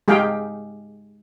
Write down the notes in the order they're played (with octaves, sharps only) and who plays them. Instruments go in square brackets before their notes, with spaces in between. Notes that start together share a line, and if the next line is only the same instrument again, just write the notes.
[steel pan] G#3 G4 G#4 F5 G5